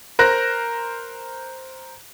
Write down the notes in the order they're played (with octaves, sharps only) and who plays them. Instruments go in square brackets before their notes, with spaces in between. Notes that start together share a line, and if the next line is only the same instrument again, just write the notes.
[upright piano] A#4 C5 F#6 A#6